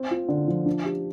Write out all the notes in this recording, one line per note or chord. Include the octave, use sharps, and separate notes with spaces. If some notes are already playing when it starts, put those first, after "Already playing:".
Already playing: C4
F4
D3
F3
D4
G4